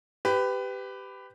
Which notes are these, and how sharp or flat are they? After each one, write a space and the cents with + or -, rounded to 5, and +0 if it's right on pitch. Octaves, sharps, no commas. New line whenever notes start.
G4 +0 B4 +20